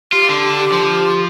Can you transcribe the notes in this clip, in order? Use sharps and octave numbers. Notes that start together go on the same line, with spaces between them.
F4 G4
D3
F3